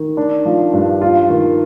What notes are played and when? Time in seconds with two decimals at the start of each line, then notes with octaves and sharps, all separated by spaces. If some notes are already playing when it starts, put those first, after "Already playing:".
Already playing: D#3
0.17 D4
0.45 F3
0.73 G2
1.01 F4
1.30 D#3